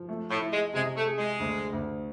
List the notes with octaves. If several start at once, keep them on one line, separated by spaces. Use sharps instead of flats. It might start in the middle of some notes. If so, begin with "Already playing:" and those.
Already playing: F3
A3
A2
E4
G#3
C3 G#3
A3
G#4
G#3
D2
D2